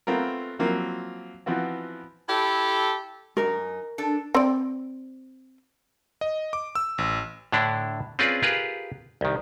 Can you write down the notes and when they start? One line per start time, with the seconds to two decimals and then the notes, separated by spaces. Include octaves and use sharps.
0.07 A3 B3 C4 F4 A#4
0.59 F3 F#3 A#3 C4 E4 F4
1.46 E3 F3 B3 C4 F#4
2.29 E4 G4 A4
3.37 F#2 D#4 A#4
3.98 D4 A4
4.35 C4 D5
6.21 D#5
6.53 D6
6.75 E6
6.98 A1
7.52 A2 D3 D4 E4
8.19 C4 C#4 F4 G#4 B4 D5
8.43 F4 G4 G#4 A#4 B4
9.21 C2 D#3